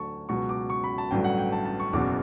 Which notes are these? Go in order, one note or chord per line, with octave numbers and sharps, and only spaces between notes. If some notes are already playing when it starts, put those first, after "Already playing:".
Already playing: D2 D3 F#3 A5 C#6
C#2 B2 F#3 C#6
D6
C#6
B5
A5
A1 G2 D3 F#3 G5
F#5
G5
A5
A5
C#6
F#1 E2 B2 F#3 D6